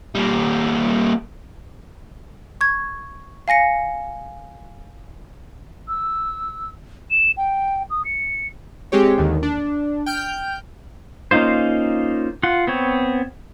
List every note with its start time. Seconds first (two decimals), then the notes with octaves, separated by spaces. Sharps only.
0.15 G3 A#3
2.61 C#6 G#6
3.48 F5 G#5 A#6 C#7
5.88 E6
7.10 E7
7.37 G5
7.90 D#6
8.05 C#7
8.92 G#3 C4 G4 C#5
9.18 D#2 D3 D#3
9.43 D4
10.06 G5 F6 G6
11.31 A#3 C#4 D#4 F4 C5
12.43 F4 F#5
12.67 B3 C4 C#5